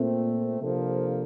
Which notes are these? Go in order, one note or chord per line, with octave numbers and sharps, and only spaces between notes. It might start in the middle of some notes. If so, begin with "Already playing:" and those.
Already playing: A#2 A3 C4
C3 F3 A#3 D4 A4